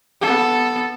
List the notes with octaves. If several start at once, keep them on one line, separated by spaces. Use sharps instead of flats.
B3 A4